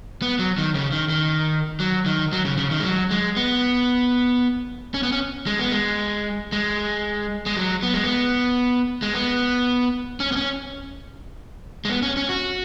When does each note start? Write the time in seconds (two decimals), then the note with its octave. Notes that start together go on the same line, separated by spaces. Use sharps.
0.22 B3
0.39 F#3
0.58 D#3
0.75 C#3
0.92 D#3
1.10 D#3
1.80 F#3
2.06 D#3
2.33 F#3
2.45 C#3
2.58 C#3
2.71 D#3
2.80 G#3
2.84 F#3
3.11 G#3
3.37 B3
4.94 C#4
5.03 B3
5.12 C#4
5.46 G#3
5.59 B3
5.72 G#3
6.52 G#3
7.46 G#3
7.57 F#3
7.83 B3
7.94 G#3
8.04 B3
9.02 G#3
9.14 B3
10.20 C#4
10.32 B3
10.36 C#4
11.85 G#3
11.89 B3
12.03 C#4
12.17 C#4
12.29 F#4